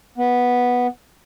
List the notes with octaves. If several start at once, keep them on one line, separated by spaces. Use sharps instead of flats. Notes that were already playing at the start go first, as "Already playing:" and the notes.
B3